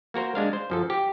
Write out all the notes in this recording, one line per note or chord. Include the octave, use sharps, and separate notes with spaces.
A#3 F#4 A#4 C5
G#3 D4 F5
C5
F#2 F3 A4
G4